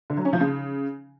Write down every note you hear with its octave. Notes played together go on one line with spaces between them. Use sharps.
D3
F#3
C#4
F3
C#3